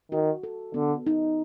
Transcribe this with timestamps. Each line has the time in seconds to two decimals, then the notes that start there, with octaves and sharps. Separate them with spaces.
0.12 D#3 F#4
0.43 A4
0.74 D3 B3
1.07 D#4